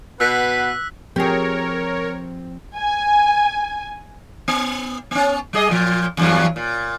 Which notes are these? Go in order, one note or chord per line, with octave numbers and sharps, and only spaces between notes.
B2 B4 F#5 E6 F#6 B6
F3 C4 G4 G#4 A#4 C#5
G#5
B3
B3 C#4
G3 G#4 D#5
A#2 F3
E2 G2 F#3
A#2